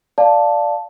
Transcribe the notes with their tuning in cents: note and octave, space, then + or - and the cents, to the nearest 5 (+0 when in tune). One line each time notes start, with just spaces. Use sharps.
D5 +0 F5 +0 A5 +0